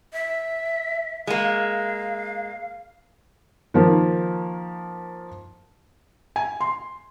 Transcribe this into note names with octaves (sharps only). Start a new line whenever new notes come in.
E5
G#3 A#3 F5
D#3 F3 A#3
G#5
C6